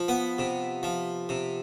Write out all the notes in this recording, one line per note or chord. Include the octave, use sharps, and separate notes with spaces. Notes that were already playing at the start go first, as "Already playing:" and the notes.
Already playing: F3
B3
C3
F3
C3